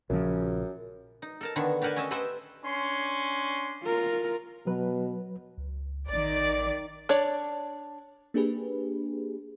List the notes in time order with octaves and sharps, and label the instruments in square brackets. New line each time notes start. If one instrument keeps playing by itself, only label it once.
[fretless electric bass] A#1 C#3 F3 [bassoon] F#2
[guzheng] D#4
A4 A#4 A5
D3 D#3 B3 C#5
D4 G4 A#4 F#5 G#5 A5
C#4 C#5 D#5 E5 A5
A4 B4 C5 D#5 E5 G5
[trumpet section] C#4 D4 C6
[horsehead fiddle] F4 A#4
[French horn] B2 [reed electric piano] F#3 B4
[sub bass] C#2
[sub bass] A1 [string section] D#3 D5
[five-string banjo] D4 C#5 D5
[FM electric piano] A#3 D4 G4 G#4 B4